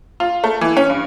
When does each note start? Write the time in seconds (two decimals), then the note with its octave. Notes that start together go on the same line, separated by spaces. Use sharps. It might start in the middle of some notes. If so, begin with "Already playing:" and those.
0.20 F4
0.44 A3
0.61 E3
0.77 C#4
0.90 G2